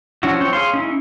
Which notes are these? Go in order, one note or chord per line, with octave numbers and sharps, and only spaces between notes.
F3 C#4 D4 E4 F#4
C4 C#5 G5
G#4 C#5 F5 C6
C#4 D#4 E4